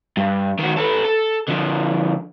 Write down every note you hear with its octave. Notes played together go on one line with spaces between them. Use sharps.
G2
D#3 F#4
A4 B4
A4
D3 F3